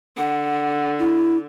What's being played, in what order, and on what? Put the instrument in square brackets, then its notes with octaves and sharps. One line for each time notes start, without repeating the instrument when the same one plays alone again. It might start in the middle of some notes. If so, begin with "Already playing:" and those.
[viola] D3 [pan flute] F#5
[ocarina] E4